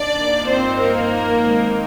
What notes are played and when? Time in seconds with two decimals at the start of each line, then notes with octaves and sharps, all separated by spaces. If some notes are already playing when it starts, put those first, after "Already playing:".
Already playing: D4 D5
0.16 G2 F3 A#3 D#4
0.48 C4 C5
0.80 A#3 A#4
1.43 D#3 G#3 C4 D#4